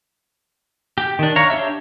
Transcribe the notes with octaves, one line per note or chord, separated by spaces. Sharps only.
G4
D#3 D4
C#5 F5 A#5 C#6
D4 G4 C#5 E5